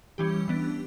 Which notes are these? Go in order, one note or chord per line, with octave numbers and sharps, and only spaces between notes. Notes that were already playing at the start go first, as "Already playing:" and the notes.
E3 G3 C#4 G4
E3 B3 D4